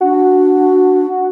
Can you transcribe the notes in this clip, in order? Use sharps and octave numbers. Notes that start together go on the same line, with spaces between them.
D4 F#4